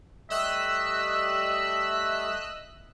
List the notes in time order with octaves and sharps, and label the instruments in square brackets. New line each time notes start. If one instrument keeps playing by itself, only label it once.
[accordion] G3 A3 [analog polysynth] D#5 E6 F#6 [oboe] E5